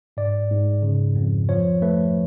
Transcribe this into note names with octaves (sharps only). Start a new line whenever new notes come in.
G#2 D5
G#2
C#3
F2
F3 C#5
A3 B4